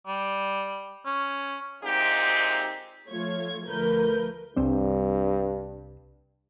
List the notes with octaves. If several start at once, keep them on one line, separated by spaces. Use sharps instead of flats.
G3
C#4
D2 A#2 G#3 C4 D#4 G4
F3 A3 F4 C#5 G#6
D2 F3 A3 A#4 B4 G6
C2 G2 C4 D4